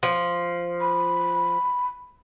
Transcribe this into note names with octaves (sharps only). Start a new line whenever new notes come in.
F3
B5